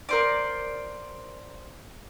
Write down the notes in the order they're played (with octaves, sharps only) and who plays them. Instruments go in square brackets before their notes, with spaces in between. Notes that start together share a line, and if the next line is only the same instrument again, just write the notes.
[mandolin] A#4 C5 D5